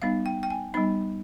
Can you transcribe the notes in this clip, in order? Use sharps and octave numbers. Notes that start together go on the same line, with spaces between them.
G3 B3 D#4 F5
G5
G5
G#5
G3 B3 D#4 B5